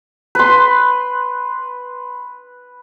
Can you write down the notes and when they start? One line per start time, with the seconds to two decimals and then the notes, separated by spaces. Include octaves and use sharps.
0.35 B4 C6